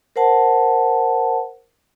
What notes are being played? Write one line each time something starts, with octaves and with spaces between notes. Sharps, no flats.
A#4 C5 F#5 A5